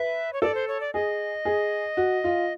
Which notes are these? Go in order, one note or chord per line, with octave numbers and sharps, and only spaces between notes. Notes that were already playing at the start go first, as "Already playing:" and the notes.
Already playing: B4 E5
C#5
A4 D5
C5
C#5
D5
G#4 D#5
G#4
F#4
F4